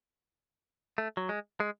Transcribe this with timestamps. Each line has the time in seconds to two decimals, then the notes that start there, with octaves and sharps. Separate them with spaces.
0.98 A3
1.17 F#3
1.29 G#3
1.60 G#3